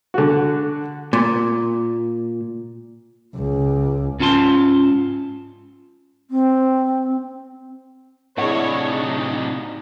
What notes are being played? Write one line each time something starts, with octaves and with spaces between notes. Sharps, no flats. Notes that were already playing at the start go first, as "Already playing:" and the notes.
D3 F#4
A#2
C#2
G#2 C#4 F4 A5 C6
C4
A2 C3 D4 E4 G#4 C#5 D#5 F#5
D#4